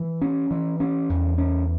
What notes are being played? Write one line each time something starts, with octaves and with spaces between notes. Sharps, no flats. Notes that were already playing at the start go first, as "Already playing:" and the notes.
Already playing: E3
C#4
E3
C#4
E2
C#4